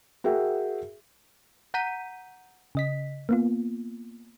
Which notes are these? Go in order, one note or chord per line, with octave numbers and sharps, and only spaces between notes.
F#4 G#4 A#4 E5 G5
F#5 A#5 G6 B6 D#7
C#3 D#5 B6
A#3 B3 F4